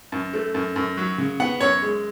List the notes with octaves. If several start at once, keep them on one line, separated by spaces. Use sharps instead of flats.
F#2
A3
F#2
F#2
F#3
C#3
B3 F#5
F#2 C#5
G#3